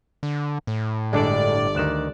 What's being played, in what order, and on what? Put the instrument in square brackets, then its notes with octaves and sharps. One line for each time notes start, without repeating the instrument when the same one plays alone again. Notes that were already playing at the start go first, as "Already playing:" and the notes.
[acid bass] D3
A2
[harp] G1 [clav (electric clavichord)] G#3 D4 A4 [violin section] D5
[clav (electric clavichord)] D2 D#3 [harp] D6 F#6 E7